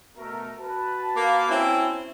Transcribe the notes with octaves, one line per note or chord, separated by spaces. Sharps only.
B2 A3 A#4
F#4 B4 A5
A#3
C4 C#4 E4